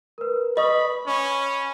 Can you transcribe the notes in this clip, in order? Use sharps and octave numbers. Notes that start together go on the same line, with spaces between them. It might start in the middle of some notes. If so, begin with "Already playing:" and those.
A#4 B4
B4 D#5 B5 C#6 D#6
C#4 B5 C#6